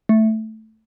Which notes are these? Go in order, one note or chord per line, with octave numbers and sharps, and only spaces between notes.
A3